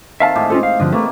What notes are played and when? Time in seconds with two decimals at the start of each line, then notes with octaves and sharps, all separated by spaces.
0.20 D#3 C4 A4 E5 F5 A5
0.36 A2 G#3 G4
0.50 G#3 C#4 F4 A4 C5
0.63 F5
0.80 G2 D3 F3 D#5
0.92 C3 E3 A3 A#3